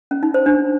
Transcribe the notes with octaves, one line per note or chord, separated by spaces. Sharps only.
C#4
D#4
C5
D4